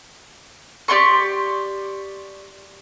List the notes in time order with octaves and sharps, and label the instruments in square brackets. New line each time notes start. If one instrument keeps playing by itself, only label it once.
[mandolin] G4 D5 C6 C#6